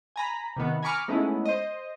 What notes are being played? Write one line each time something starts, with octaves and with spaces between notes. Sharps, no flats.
G#5 A#5 B5
C3 D#3 B3
G#5 A#5 B5 C#6 D6 F6
G#3 A3 B3 C#4 D#4 E4
C5 D#5